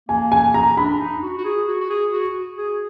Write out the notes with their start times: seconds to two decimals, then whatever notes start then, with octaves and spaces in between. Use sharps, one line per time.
0.08 A#3 G#5
0.32 G#5
0.54 A#5
0.77 D4 B5
0.99 D#4
1.22 F#4
1.38 F#4
1.44 G#4
1.67 F#4
1.80 F#4
1.90 G#4
2.13 F#4
2.57 G#4